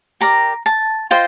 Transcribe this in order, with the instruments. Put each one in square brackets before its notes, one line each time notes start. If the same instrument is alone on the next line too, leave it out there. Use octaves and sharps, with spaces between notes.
[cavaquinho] G4 A#4 D5 A#5
A5
F4 C5 D#5 G5